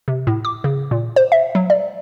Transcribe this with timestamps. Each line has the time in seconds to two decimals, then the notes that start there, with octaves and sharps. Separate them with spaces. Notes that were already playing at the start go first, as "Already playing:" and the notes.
0.08 C3
0.27 A2
0.45 D6
0.64 C#3
0.91 A#2
1.16 C5
1.32 E5
1.55 F#3
1.70 D5